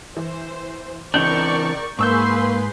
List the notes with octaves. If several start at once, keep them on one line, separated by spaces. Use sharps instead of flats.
E3 C5
C#2 E3 C4 D4 A#4 D5 C#6 G6
G#2 A#3 G#4 B4 C6 C#6 E6 G6